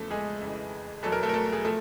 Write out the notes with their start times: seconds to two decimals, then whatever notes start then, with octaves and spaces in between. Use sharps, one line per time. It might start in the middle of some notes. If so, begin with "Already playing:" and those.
Already playing: E2 C#3 F3 A3 A4
0.11 G#3 G#4
0.41 F2 C#3 E3
1.03 E2 B2 F#3 A4
1.12 A#4
1.23 A3 A4
1.29 A#4
1.34 A3 A4
1.53 G#4
1.65 F3 A3 A4